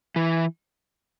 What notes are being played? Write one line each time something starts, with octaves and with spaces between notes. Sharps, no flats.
E3